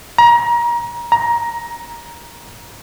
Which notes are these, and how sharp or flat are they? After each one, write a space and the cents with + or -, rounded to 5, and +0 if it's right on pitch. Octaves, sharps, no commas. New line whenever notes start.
A#5 +30
A#5 +15